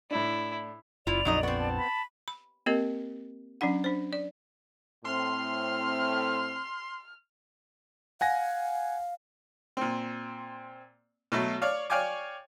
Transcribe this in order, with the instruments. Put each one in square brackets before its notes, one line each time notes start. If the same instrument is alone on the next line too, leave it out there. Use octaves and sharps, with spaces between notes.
[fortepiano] A2 D4 [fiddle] E4
[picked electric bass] F#1 [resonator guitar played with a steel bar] E4 F4 [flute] D5 [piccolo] F7
[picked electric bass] A#1 F2 [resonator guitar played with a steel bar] F#3 D#4 D#5
[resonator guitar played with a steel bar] B3 C4 [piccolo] C#6
[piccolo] A5
[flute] B5
[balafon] B5
A#3 C4 G4 A#4 D#5
F#3 C#4 D4 F#5
D4 C5
D5
[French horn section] A2 C4 [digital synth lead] C6 [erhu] F6
[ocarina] F5 [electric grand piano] F#5 G#5 A#6
[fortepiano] A#2 C4
B2 F#3 A3
C#5 D5 F5
C#5 D5 F5 G5 G#5 D6